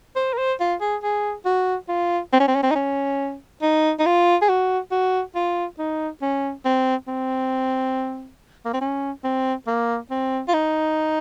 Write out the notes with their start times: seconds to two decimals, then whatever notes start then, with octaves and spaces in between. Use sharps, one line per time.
0.16 C5
0.33 A#4
0.38 C5
0.60 F4
0.81 G#4
1.03 G#4
1.46 F#4
1.89 F4
2.33 C4
2.40 C#4
2.48 C4
2.56 C#4
2.63 C4
2.71 D#4
2.75 C#4
3.62 D#4
3.99 D#4
4.06 F4
4.42 G#4
4.49 F#4
4.92 F#4
5.35 F4
5.79 D#4
6.22 C#4
6.65 C4
7.08 C4
8.65 A#3
8.73 C4
8.81 C#4
9.24 C4
9.67 A#3
10.10 C4
10.48 F4
10.54 D#4